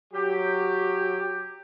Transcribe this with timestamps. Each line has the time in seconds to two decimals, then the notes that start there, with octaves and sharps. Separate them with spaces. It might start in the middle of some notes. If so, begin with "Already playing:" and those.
0.14 F#3 G4